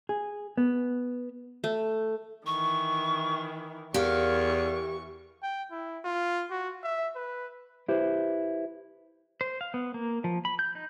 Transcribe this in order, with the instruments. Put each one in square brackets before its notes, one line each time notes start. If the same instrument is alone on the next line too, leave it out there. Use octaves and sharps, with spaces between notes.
[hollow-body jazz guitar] G#4
B3
[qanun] A3
[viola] D#3 E3 [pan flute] C#6
[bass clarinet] E2 [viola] E3 C#6 [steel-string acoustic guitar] G4 F5 [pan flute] A#4
[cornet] G5
E4
F4
F#4
E5
B4
[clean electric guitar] E4 G4 B4 C5
[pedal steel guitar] C5
F5
B3
A#3
F3
B5
G6
D#4